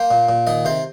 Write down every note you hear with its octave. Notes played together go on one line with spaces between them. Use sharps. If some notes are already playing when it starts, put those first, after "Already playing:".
Already playing: A#3 C5
A#2
A#2
D#3 D#5
C3 C5